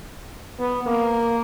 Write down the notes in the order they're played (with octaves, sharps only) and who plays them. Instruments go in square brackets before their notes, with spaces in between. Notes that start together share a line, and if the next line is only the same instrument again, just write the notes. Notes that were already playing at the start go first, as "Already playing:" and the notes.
[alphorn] B3
A#3